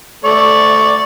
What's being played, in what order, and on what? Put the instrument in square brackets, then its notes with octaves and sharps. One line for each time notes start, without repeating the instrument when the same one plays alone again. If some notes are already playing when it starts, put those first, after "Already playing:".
[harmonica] A3 D5 C#6